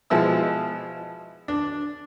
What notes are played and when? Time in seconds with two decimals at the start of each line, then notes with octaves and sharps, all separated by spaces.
0.10 B2 F3 G#3 E4 E6
1.48 D4